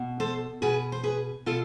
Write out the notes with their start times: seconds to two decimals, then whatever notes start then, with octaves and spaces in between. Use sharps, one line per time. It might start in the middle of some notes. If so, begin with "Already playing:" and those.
Already playing: B2
0.20 A4 C5
0.62 B2 G#4 B4
0.92 C5
1.04 G#4 B4
1.46 B2 F4 A4